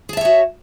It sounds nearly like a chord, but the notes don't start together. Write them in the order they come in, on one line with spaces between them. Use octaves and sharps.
G#4 A5 E5 C#5 F#4